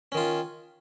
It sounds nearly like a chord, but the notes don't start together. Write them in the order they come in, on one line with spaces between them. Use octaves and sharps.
C#4 D#3 F4